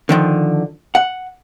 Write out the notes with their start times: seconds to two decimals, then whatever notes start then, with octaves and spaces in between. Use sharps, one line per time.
0.09 D3 D#3 F3
0.95 F#5